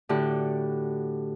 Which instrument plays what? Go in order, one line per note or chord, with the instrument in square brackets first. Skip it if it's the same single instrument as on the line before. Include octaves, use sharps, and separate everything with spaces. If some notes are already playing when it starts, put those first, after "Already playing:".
[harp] A2 D3 F#4 G4